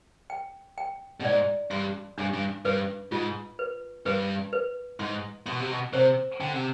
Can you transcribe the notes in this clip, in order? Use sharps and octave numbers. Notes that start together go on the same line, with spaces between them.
G5
G5
B2
G#2 D5
G2 C6
G2 D4
G2
G2 B4
G#2 F4
B4
G2 B4
B4
G#2 C6
B2 C6
C3
B2
C3 C5
D3 G5
C3